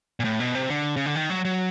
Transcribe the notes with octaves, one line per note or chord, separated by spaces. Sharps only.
A#2
A2
B2
C3
D3
C#3
D3
D#3
F#3
F#3